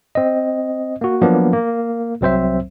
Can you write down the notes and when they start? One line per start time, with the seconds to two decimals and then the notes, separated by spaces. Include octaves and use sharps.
0.15 C4 D#5
1.01 A#3 F#4
1.22 F3 F#3 A#3 B3 D4
1.53 A#3
2.21 C2 F#3 C4 C5 E5